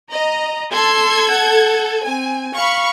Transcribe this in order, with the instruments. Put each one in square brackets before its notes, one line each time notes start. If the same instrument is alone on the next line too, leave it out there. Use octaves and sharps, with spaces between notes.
[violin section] D#5 [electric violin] A#5
[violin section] A4 G#6 [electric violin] C6 E6
[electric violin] F#5
[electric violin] C4 [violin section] G#5
[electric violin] F5 [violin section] B5 C#6